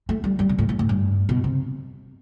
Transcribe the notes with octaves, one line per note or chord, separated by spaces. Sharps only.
A3
G3
G3
B2
A2
A2
A2
G2
B2
C3